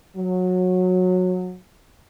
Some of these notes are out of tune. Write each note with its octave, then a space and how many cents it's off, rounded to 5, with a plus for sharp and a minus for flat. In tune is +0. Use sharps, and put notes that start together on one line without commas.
F#3 -20